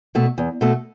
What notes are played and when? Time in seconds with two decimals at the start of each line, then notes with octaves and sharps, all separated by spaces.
0.15 B2 A3
0.38 E2
0.61 B2 A3